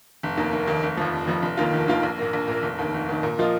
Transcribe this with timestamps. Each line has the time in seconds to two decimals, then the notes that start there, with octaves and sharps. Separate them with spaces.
0.23 F1
0.37 D#2 D#3 A#3
0.53 F1
0.67 D#2 D#3 A#3
0.83 F1
0.97 F2 F3
1.13 F1
1.27 F2 F3
1.42 F1
1.57 D#2 D#3 A#3 F4
1.73 F1
1.88 D#2 D#3 A#3 F4
2.03 A#1
2.18 A#2 A#3
2.33 A#1
2.48 A#2 A#3
2.63 F1
2.79 D#2 D#3
2.94 F1
3.09 D#2 D#3
3.23 A#2
3.39 F3 A#3 F4 D#5